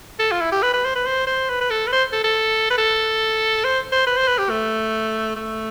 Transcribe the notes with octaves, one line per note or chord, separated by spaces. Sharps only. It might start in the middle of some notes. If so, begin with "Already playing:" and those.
A4
F4
E4
G4
B4
B4
C5
B4
C5
C5
B4
B4
A4
B4
C5
A4
A4
B4
A4
C5
C5
B4
C5
B4
G4
A3
A3